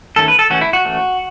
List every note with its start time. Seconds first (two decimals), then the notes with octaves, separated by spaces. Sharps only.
0.16 D#3 A3 C#4 A4
0.28 B4
0.39 A4
0.50 E3 A3 C#4 F#4
0.61 E4
0.73 F#4
0.85 E3 A3 C#4